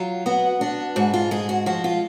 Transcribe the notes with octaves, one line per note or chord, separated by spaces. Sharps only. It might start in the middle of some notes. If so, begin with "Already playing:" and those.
Already playing: F#3 F4
B3 F#4
D4 F#4
G#2 F#4
F4
G#3 G#4
F#4
F3 F#4
F4